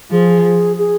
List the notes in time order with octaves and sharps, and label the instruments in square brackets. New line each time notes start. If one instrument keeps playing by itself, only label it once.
[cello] F3 [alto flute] G#4
[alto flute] G#4